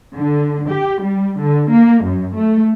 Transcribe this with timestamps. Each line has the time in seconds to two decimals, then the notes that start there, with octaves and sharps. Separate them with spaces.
0.14 D3
0.69 G4
1.01 G3
1.38 D3
1.69 A#3
2.04 F#2
2.36 A3